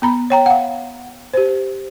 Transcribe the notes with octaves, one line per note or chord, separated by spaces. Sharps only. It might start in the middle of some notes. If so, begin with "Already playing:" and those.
B3 A#5 B5
C#5 G5 A#5
F5 F#5
G4 C5